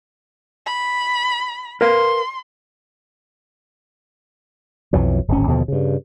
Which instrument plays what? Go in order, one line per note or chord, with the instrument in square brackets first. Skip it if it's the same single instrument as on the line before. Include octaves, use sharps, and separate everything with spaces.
[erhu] B5
[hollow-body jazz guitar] A#4 B4 F5 [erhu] C6
[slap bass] B1 F2 E3 F#3
D1 G#1 C#4
D#2 B2 D3 F3
G2 C#3